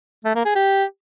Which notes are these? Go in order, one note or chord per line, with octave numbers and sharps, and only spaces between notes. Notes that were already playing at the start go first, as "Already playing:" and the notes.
A3
A#3
G#4
G4